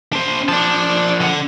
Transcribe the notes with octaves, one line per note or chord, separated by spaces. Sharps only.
D4 C5
F3 D4 D5 A5
D3 F#5